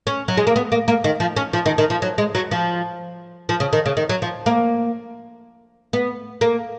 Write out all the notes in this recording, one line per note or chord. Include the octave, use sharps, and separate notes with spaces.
C#4
F#3
G#3
A#3
B3
A#3
A#3
D#3
F3
C#4
F3
D#3
D#3
F3
F#3
G#3
F#3
F3
F3
C#3
D#3
C#3
D#3
F#3
F3
A#3
B3
A#3